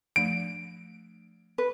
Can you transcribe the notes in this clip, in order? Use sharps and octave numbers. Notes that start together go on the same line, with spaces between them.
F3 A3 D4 D7
B4